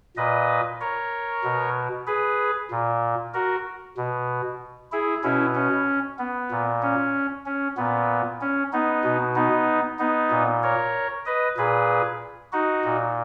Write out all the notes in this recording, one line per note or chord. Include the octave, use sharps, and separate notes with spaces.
A#2 B4 D#5
A#4 C#5
B2
G#4 B4
A#2
F#4 A#4
B2
E4 G#4
B2 C#4 E4
C#4
B3
A#2
C#4
C#4
A#2 B3
C#4
B3 D#4
B2
B3 D#4
B3 D#4
A#2
A#4 C#5
B4 D#5
A#2 G#4 B4
D#4 F#4
A#2